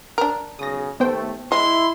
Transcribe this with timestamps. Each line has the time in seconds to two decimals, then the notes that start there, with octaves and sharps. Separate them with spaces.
0.18 D4 A#4
0.59 B1 C#3 G#4 D#6 A#6
1.00 D#2 A3 B3 C5 G5
1.52 G#3 E4 C6